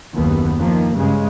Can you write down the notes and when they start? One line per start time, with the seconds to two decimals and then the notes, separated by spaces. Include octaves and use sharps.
0.15 F#1 D#2 B3
0.58 D#3 F3 A#3
0.94 G2 C#3 G#3